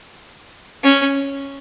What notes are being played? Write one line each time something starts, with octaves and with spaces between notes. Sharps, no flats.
C#4